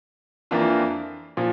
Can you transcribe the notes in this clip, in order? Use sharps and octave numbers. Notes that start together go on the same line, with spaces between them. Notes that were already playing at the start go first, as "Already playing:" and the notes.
F2 E3 A#3 D4 F4
A#2 F3